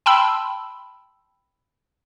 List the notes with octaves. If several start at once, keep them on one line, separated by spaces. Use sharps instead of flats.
G5 A5 B5 C6 E6